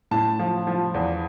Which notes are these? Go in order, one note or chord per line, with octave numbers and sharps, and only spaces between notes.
A2 A5
F3
F3
E2